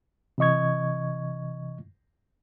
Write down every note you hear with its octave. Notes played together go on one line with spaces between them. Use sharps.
C3 E3 D#5 C#6 G#6